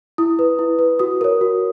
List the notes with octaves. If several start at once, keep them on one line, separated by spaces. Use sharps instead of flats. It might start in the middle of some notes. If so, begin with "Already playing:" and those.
E4 D#6
B4
E4
B4
F#4 D#6
A#4 C#5
F#4